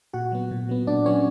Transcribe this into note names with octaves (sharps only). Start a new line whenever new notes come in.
A#2 F#4 F#5
F#3 B3
A#2
F#3 B3
A#2 D4 D5
F#3 B3 C#4 C#5